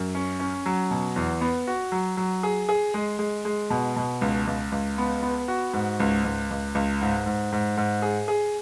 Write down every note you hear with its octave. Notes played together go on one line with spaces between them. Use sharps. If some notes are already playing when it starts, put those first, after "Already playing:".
Already playing: F#2
C#4
C#4
F#3
B2
E2
B3
F#4
F#3
F#3
G#4
G#4
G#3
G#3
G#3
B2
B2
C#2
C#2
C#2
B3
B3
F#4
G#2
C#2
C#2
C#2
C#2
G#2
G#2
G#2
G#2
G#4
G#4